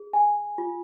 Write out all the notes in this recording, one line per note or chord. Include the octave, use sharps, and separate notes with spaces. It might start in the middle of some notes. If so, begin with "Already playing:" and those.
Already playing: G#4
G#5
F4